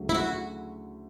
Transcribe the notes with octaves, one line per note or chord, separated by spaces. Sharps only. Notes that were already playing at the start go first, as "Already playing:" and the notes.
Already playing: D2 C#3 F#3
E4
F#4